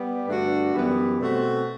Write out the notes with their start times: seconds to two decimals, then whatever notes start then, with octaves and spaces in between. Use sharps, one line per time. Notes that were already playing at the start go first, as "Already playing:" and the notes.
Already playing: G3 B3 G4
0.27 G2 D3 A3 D4 F#4
0.73 F#2 E3 G3 B3
1.19 B2 A3 C4 F#4